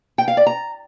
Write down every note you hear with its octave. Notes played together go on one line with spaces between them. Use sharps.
G5
F5
D5
A#5